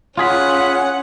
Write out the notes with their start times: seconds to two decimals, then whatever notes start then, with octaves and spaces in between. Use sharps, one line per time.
0.18 C#4 F4 G#4 F#5 B5